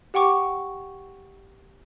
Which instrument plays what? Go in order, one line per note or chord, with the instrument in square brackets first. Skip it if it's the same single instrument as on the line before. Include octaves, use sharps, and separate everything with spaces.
[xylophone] G4 F#5 G5 C#6 D6